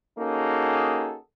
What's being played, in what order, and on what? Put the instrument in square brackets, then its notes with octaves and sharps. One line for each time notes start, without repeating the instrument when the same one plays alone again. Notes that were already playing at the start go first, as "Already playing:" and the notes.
[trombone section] A#3 C#4 D#4 F#4 G#4 A4